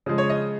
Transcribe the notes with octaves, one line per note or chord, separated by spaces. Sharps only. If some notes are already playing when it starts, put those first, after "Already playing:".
C#3 F3 G#3
C#5
D#5